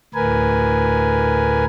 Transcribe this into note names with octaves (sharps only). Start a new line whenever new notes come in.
D2 A2 A#4 B4 G#5